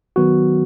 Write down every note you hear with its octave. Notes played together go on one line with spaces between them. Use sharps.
D#3 F#3 B3 F#4